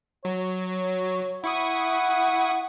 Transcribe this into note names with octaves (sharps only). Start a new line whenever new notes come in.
F#3 C#5
E4 F#5 C#6 D#6